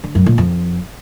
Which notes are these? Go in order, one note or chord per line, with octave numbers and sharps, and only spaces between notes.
D3
F#2
A#2
F2